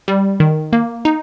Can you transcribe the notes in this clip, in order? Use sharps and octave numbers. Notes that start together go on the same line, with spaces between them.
G3
D#3
A#3
D#4